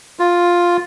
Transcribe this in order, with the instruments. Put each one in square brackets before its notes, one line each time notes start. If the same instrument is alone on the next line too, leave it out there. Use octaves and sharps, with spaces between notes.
[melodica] F4